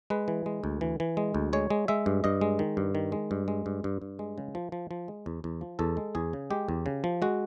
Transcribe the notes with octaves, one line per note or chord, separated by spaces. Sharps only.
G#3 B4
E3
G#3
D2
E3
E3
G#3
D2
G#3 C#5
G#3
G#3 E5
G2
G2 D#5
G#3
D#3
G2
D#3
G#3
G2
G#3
G2
G2
G2
G#3
C#3
F3
F3
F3
G#3
E2
E2
F3
E2 A4
G#3
E2 G#4
C#3
G#3 G4
E2
C#3
F3
G#3 F#4